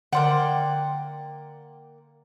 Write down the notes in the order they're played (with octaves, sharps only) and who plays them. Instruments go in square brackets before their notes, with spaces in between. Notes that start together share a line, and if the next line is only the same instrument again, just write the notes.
[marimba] D3 C6 [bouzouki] A#3 D5 G5 [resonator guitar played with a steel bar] F#5